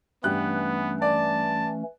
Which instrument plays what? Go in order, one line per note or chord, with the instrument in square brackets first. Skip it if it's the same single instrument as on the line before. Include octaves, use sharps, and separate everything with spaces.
[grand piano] G2 G4 F#6 [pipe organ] E3 A3 C#4 [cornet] B3
[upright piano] D5 [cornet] A5